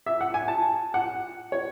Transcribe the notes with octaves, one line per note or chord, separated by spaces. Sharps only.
E5
F#5
G#5
A5
F#5
C#5